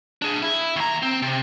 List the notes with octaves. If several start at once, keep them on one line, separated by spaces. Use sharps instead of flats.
D4 G#4
E4
D#2 A#5
C4
C3